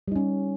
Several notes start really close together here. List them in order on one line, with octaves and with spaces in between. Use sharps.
G3 D#4 C#4